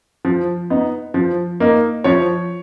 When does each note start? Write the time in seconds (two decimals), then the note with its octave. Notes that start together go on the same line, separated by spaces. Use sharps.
0.25 F3
0.70 B3 D#4
1.14 F3
1.60 A#3 D#4
2.04 F3 C#5